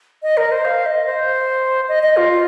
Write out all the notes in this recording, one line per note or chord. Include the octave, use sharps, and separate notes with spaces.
D#5
A#4
C5
F5
D#5
C5
D#5
D#5
F4